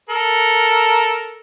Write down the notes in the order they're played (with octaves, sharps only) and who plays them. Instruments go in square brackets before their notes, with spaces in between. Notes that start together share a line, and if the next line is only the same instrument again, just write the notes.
[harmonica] A4 A#4